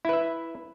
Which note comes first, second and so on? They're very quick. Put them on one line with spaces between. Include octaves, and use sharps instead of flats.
E4 B4 E5